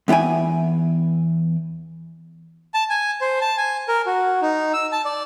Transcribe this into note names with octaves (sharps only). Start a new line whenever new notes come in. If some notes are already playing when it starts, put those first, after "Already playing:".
E2 B3 E4 G5 G#5
A5
G#5
C5
A5
G#5
A#4
F#4
D#4
E6
A5
D5